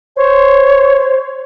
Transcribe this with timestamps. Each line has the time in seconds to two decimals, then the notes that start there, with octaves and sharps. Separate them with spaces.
0.17 C5 C#5